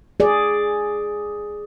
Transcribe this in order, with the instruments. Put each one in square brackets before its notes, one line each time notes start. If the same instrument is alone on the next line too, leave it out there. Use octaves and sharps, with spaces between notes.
[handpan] G#4 D5